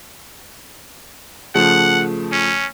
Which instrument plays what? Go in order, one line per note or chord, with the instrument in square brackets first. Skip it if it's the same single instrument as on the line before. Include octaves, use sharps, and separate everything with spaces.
[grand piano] C#3 F3 A3 [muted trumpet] F#5
[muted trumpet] C#4